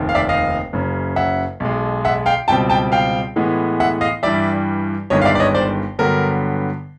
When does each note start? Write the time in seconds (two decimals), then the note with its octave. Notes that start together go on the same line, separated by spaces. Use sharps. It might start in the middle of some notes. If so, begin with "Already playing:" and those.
Already playing: F1 D#2 D#3
0.09 F5
0.15 D5 E5
0.29 D#5 F5
0.73 F#1 F#2 C#3
1.16 E5 F#5
1.60 B1 B2 G#3
2.05 E5 F#5
2.26 F5 G5
2.48 C#2 B2 G3 C4 G5 A5
2.70 G5 A5
2.92 F5 G5
3.36 A2 E3 G#3 B3
3.80 E5 F#5
4.01 D#5 F5
4.23 G2 E3 G3 D5 E5
5.10 G1 G2 D#3 G#3 C#5 D#5
5.22 F5
5.25 D5 E5
5.35 D5
5.40 C#5 D#5
5.55 C5 D5
5.99 G2 D3 F#3 B3 A#4